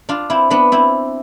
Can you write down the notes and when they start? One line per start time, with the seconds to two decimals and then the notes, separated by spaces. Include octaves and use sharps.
0.09 D4 F4
0.30 C4 E4
0.50 B3 D4
0.72 C4 E4